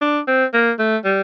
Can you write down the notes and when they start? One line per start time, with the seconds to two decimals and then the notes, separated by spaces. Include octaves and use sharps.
0.01 D4
0.27 C4
0.53 A#3
0.79 A3
1.04 G3